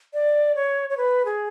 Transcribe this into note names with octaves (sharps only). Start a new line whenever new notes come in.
D5
C#5
C#5
B4
G#4